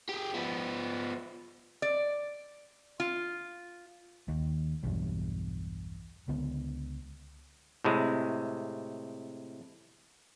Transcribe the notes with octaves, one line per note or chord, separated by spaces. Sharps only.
G4 G#4
F3 B3
D5
F4
D#2
B1 E2 G2
C#2 D3 B3
A2 C3 G#3